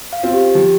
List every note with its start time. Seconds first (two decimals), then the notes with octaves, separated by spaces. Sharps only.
0.13 F5
0.23 C4 F4
0.33 G4
0.55 F3 G4